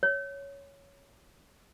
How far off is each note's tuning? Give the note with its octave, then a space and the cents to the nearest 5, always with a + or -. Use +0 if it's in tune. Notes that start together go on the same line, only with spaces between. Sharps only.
C#5 +5